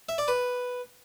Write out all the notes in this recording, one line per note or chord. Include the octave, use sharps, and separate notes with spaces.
E5
D5
B4